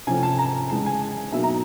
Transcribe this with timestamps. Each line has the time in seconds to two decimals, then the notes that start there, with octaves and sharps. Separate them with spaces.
0.07 C3 F3 A3 C#4 G#5
0.23 A5
0.38 A#5
0.70 C#3 E3 G#3 A5
0.86 G#5
1.32 B2 F#3 A#3 D#4 E5
1.43 A#5